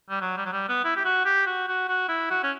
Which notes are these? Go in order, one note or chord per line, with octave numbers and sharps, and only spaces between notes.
G3
F#3
G3
F#3
G3
B3
E4
G4
F#4
G4
F#4
F#4
F#4
E4
F#4
C#4